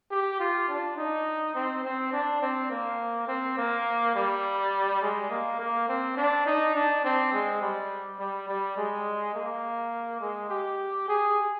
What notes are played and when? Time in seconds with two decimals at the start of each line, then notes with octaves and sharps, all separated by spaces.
0.11 G4
0.40 F4
0.68 D4
0.97 D#4
1.55 C4
1.85 C4
2.13 D4
2.41 C4
2.71 A#3
3.28 C4
3.58 A#3
4.15 G3
5.02 G#3
5.30 A#3
5.60 A#3
5.89 C4
6.17 D4
6.46 D#4
6.75 D4
7.04 C4
7.33 G#3
7.61 G3
8.19 G3
8.49 G3
8.77 G#3
9.35 A#3
10.21 G#3
10.50 G4
11.08 G#4